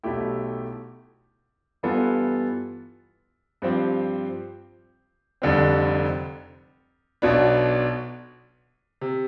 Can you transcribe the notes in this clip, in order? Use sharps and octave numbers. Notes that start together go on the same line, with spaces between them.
B1 B2 A3 E4 G4
G2 E3 B3 F4 A4
G2 F3 C4 G4
F1 F2 D3 G3 C4
B1 B2 B3 D4
C3